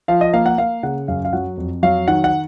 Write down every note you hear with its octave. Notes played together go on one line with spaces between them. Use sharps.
F3 F5
D#5
A#3 F5
F#5
A#3 F5
C#3 F#5
F#2 F5
F5
F#3 F#5
F2
F#3 F5
D#3 F#5
F#5